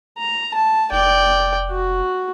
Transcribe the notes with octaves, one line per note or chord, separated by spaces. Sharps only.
A#5
A5
F1 D5 G5
F#4